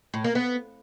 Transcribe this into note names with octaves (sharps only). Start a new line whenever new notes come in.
A2
A#3
B3